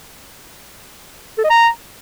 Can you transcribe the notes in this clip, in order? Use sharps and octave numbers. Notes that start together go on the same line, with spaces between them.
A4
D#5
A#5